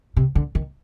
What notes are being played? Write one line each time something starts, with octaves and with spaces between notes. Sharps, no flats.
C3
D3
D#3